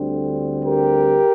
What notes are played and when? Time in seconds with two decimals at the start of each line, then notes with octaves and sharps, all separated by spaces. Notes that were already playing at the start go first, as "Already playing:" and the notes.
Already playing: D2 D3 G3 C4
0.64 G4 A#4